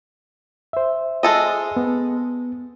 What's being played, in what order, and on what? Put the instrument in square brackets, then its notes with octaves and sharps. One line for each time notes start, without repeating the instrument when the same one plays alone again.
[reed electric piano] C5 E5
[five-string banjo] G#3 A4 D#5
[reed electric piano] B3